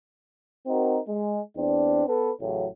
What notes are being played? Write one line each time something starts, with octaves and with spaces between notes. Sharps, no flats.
C4 D#4 F#4 A#4
G#3
E2 C4 D4
B3 A4 B4
A1 A2 C#3 F#3